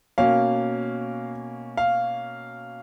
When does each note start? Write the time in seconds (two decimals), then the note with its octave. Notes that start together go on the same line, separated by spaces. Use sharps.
0.18 B2 A#3 C#4 F5
1.77 F5